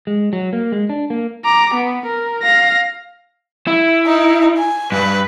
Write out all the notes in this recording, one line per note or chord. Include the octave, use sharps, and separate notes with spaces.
G#3
F#3
A#3
G#3
D4
A#3
A#5 D6
B3
A#4
F5 A#6
E4
D#4
G#5
G2 B4